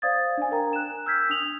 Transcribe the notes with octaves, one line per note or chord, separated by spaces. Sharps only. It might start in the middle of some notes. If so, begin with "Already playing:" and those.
C5 D5 F5 D#6 G#6 A6
D4 G#5
A#4 G5 A#5
F#6 E7
E6 F6 G6 G#6 B6
D4 D#6 F7 F#7